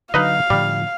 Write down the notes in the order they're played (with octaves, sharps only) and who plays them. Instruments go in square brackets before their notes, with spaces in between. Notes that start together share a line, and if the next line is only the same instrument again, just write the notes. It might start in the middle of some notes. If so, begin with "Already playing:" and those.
[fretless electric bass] D3 F3 F#3 [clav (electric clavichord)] D#4 B4 D#5 [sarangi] F5
[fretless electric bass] A2 D3 F3 [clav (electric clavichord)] G3